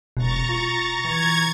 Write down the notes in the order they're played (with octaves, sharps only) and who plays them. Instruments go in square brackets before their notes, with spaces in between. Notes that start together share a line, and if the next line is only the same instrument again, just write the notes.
[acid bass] E1 [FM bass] B2 [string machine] A#5 C#6 A6
[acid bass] F4
[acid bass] E3 [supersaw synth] G#6